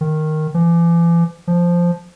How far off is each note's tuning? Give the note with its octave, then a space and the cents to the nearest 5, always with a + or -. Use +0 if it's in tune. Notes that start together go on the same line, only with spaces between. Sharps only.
D#3 -5
E3 +45
F3 -5